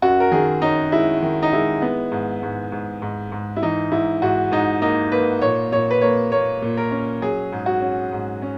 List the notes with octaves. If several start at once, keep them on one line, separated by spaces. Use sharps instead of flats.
F#2 F#4
A#4
D#3 G#4
C#4 D#4
G#3 E4
D#3
D#4
G#3 E4
B3
G#2
G#2
G#2
G#2
G#2
E4
E3 D#4
G#2 E4
G#2 F#4
G#2 D#4
A#3 D#4
A#3 B4
A#2 C#5
A#2 C#5
B4
A#3 C#5
A#3 C#5
A#2
A#4
C#4
F#3 G#4
G#2
F#4
C#4
G#2
C#4